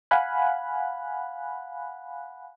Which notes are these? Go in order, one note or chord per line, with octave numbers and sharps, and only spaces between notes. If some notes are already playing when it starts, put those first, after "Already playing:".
F5 F#5 G#5 B5 F#6